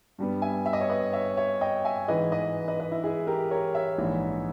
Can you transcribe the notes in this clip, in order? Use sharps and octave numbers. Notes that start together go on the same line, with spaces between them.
G2 G3 B3
E5 G#5
E5
D#5
C#5 E5
B4 D#5
C#5 E5
C#5 E5
D#5 G5
E5 G#5
G#2 E3 G#3 B4 D#5
B4 D#5
B4 D#5
B4 D#5
E4
E4 G#4
G4 A#4
A#4 C#5
C#5 E5
A#1 G#2 E3